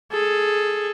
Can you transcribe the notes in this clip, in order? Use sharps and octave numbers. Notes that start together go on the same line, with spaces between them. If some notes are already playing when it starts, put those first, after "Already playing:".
G#4 A4